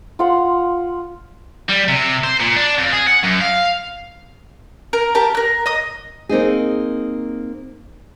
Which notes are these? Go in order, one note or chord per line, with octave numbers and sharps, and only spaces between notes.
F4 F#5 C6
G3
C3
C5
A#2
D4
F2
G#4
F#5
F#2
F5
A#4
G4 A#4 A5
A#4 F#6
D#5 D#6
A#3 C4 D#4 G#4